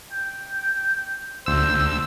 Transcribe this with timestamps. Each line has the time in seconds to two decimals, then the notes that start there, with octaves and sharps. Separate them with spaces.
0.12 G5
1.46 D2 C5 E6